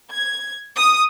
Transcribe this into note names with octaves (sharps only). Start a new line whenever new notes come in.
G#6
D#6